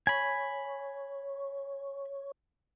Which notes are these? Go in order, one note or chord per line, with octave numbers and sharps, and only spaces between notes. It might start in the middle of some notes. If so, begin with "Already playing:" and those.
C#5 G#5 B5